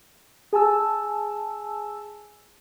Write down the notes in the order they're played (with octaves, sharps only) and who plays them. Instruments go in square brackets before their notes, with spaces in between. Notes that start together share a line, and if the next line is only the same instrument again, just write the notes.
[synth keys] G#4 G#5 A5 E6